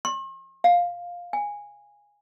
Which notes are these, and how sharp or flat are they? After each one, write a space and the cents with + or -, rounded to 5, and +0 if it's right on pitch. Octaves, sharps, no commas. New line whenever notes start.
C6 +45
F5 +10
G#5 -15